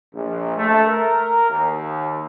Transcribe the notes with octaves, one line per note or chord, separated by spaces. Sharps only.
A#1
A3
A#4
D#2